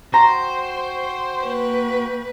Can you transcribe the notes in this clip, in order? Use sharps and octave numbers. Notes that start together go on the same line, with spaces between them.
F#4 C5 G5 A#5
A#3 B4